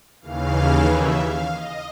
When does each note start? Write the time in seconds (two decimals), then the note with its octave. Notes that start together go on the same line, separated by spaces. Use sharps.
0.21 D#2 C#3 E3 F5
0.85 E5
1.17 F5
1.48 D#5